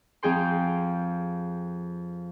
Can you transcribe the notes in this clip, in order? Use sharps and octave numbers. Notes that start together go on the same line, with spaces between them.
F2 F3 G#4 G5 C6